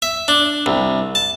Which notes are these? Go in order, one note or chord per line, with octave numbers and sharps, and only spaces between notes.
E5
D4
C2
A5